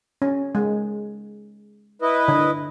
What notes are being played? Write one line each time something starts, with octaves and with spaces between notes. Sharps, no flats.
C#4
G#3
E4 B4 D#5
D3